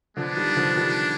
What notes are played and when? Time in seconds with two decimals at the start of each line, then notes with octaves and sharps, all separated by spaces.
0.16 D3 F3 G#3 B3 D4
0.37 D#3 G3
0.56 D3 F3
0.76 D#3 G3